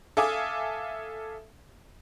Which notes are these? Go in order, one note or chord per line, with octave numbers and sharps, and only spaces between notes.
A4 E5 F5 G#5 D6 D#6